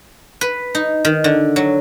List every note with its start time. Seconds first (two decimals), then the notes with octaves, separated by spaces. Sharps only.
0.41 B4
0.75 D#4
1.05 D#3
1.24 D3
1.56 F#3